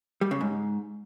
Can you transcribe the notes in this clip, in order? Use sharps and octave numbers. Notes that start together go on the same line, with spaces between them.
G3
C#3
G#2